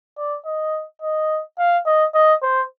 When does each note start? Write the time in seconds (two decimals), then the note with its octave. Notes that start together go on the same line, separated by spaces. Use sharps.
0.17 D5
0.45 D#5
1.02 D#5
1.58 F5
1.85 D#5
2.14 D#5
2.42 C5